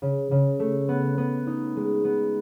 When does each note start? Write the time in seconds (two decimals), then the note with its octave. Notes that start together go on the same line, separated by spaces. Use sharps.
0.02 C#3
0.31 C#3
0.60 A3
0.89 B3
1.18 B3
1.47 D#4
1.76 G#3
2.04 B3